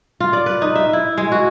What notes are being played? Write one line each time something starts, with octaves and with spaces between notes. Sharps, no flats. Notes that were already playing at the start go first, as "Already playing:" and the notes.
F4
D5
B4
D#4
E5
E4
G#3
F#4